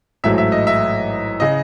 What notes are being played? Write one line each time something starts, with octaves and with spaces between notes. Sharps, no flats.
A1 G#2 F#3 A3 E5
E5
D#5
E5
C#3 D#5